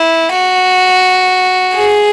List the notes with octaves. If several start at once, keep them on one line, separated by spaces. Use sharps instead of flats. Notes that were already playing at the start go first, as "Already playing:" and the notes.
Already playing: E4
F#4
G#4